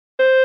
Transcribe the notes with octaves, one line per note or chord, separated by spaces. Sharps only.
C5